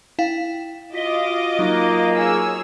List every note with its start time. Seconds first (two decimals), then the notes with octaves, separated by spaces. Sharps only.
0.19 E4 F5 G5
0.95 F4 F#4 D#5 D6 B6 G7
1.59 F#3 A#3 D#4
2.14 G#4 C#5 E6